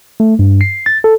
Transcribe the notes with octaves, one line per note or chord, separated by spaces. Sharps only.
A3
G2
C7
A6
A4